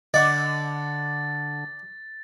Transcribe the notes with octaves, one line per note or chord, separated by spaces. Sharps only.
D3 D5 D#5 F#5 D6 A6